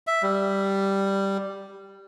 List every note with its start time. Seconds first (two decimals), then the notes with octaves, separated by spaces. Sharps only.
0.07 E5
0.22 G3